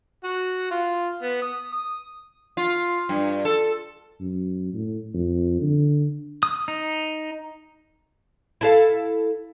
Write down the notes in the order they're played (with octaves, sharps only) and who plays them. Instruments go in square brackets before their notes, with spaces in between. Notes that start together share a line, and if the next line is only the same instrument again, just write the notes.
[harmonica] F#4
F4
B3
D#6
D#6
[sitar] F4
G2
A4
[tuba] F#2
A2
F2
D3
[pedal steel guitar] D#6
D#4
[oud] E4 A4 F5